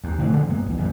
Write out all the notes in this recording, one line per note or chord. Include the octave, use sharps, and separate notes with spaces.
D#2
F1 A2 D3 E3
C#3 F3 G#3 C4
G2 A#3 B3
B1 E2
A#1 F2 E3 G3